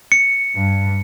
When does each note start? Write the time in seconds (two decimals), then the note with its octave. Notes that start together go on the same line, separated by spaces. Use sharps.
0.12 C#7
0.56 G2